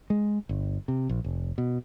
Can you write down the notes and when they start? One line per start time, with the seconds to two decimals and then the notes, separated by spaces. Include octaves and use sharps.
0.10 G#3
0.49 G1
0.88 C3
1.09 A#1
1.24 F1
1.58 B2